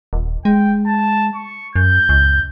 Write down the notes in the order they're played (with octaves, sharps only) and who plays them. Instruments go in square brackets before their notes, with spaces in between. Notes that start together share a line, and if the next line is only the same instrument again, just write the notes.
[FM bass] D#1
[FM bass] G#3 [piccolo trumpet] G5
[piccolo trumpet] A5
C#6
[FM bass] F#2 [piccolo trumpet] G6
[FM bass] C#2